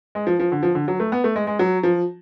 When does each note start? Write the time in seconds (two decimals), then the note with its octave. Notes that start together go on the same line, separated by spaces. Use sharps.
0.15 G#3
0.27 F3
0.39 F3
0.52 D3
0.63 F3
0.75 D3
0.88 F#3
1.00 A3
1.12 B3
1.24 A3
1.36 G#3
1.47 G#3
1.59 F#3
1.83 F3